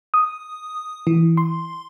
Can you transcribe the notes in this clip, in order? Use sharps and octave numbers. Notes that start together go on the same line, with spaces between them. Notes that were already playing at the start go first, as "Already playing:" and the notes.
D#6
E3
C6